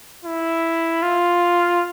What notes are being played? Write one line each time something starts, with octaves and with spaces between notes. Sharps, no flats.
E4
F4